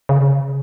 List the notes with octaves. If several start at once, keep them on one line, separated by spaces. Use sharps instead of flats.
C#3